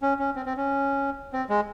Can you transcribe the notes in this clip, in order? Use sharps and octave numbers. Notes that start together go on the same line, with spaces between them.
C#4
C#4
C4
C4
C#4
C4
G#3